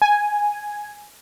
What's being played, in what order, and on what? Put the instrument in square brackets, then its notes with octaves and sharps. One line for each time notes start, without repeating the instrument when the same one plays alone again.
[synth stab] G#5